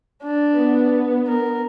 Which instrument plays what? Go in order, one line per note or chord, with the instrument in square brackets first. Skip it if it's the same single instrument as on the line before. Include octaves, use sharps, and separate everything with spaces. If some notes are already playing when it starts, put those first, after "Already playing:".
[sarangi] D4
[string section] B3
[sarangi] A#4